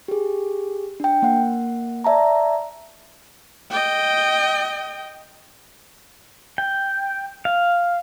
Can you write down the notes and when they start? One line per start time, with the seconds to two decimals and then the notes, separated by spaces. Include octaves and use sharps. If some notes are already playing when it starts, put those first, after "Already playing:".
0.08 G4 G#4
1.00 D4 G5
1.22 A#3 F#5
2.04 D5 E5 A5 A#5
3.70 D#5 G5
6.58 G5
7.45 F5